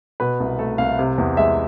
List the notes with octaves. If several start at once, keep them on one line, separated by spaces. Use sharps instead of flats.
B2 B4
C2
A3 A4
C2 F5
C3
E2
G#3 E5